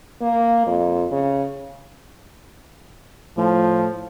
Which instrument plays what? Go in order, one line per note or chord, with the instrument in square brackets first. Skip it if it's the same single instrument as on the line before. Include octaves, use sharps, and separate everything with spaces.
[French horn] A#3
F2
C#3
[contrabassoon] A2 [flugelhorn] F3